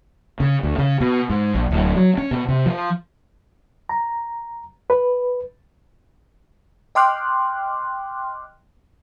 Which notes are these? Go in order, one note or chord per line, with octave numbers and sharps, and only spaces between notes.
C#3
D2
C#3
B2
G#2
A#1
D1
F#3
C#4
B2
C3
F3
A#5
B4
D#5 G5 C6 D6 F6 F#6